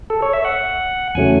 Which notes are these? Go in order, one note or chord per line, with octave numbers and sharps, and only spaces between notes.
A4
C#5
E5
F#5
E2 C#3 F#3 A3 G#5